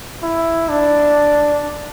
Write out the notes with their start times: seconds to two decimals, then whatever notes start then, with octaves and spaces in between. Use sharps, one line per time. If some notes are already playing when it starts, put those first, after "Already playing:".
0.23 E4
0.69 D4